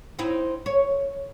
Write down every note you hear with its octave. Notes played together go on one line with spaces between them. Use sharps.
C4 D#4 E4
C#5